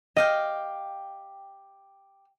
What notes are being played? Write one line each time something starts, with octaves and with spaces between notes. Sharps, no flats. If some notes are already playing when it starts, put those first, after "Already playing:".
G4 D#5 F5 G5